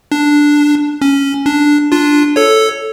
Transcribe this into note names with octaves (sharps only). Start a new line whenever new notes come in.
D4
C#4
D4
D4 F4
A4 C#5